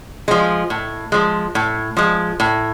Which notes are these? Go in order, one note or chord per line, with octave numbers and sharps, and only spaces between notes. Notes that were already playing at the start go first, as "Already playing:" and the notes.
F3 G#3
A2
F3 G#3
A2
F3 G#3
A2